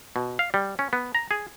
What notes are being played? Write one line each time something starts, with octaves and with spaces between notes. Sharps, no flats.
B2
F5
G3
C#4
B3
A#5
G#4